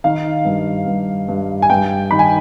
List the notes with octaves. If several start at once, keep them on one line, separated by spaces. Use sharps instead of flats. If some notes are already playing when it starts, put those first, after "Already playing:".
D#3 F5
G2
G2
G2
G#5
G2 G5
D#3 B5
G#5